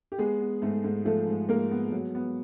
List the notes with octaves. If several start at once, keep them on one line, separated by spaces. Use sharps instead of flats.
G4
G#3 B3 G#4
B3
G#2 A3 A4
G#2
F3 A3 A4
G#2
G#3 A#3 A#4
B3
F#3
B3